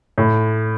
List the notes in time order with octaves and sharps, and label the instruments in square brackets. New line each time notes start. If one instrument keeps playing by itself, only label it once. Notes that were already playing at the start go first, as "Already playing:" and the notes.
[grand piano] A2